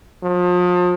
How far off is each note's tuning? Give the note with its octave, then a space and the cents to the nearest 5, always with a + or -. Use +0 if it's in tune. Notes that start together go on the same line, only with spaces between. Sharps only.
F3 +35